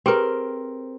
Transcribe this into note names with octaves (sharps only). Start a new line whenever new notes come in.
C4 G4 G#4 A#4 B4